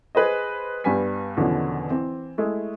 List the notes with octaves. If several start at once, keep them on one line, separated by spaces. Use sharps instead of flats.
G#4 B4 C5 D#5
G2 G3 B3 G#5 B6
E2 B2 D3 D#3 F3 C#4
E3 C4
G#3 A3 E4